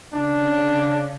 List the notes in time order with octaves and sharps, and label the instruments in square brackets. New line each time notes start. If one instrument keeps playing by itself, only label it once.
[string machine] C#3 [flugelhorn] D4